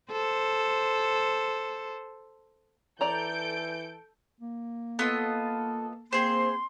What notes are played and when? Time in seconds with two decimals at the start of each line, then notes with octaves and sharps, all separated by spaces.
0.12 A4 C5
3.01 E3 A4 D5 A#5 G6 D7
4.41 A#3
4.99 B3 F4 A4 D#5
6.12 A#3 C4 G#4 C5 C6